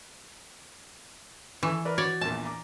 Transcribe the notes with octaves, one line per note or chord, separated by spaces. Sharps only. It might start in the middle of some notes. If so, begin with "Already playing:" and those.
E3 A4 G#5 C#6
A#4 B4 D5
F#4 C#5 D5
A#1 E2 A#2 A5
A#5 D6